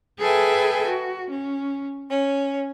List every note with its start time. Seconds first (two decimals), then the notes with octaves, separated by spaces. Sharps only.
0.18 G#4 A4 B4 E5 G5 G#5
0.87 F#4
1.29 C#4
2.10 C#4